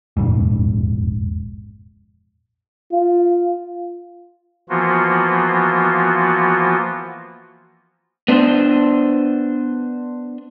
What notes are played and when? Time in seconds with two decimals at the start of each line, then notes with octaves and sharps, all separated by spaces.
0.17 E1 A#1 F2 G#2
2.93 F4
4.70 E3 F3 A#3 B3 F4 F#4
8.28 B3 D4 C5